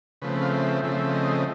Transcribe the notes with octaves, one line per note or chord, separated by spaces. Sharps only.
C#3 F3 A3 C4 B4
F5
E5
C#3 F3 A3 C4 E5
D#5